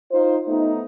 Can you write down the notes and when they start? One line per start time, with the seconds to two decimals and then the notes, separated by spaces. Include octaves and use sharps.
0.12 D#4 F4 C5
0.47 A3 B3 D#4